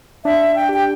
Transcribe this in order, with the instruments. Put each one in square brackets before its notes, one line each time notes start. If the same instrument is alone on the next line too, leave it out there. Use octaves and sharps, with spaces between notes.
[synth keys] D4 [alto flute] E5
[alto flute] G5
[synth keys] G4 [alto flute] G5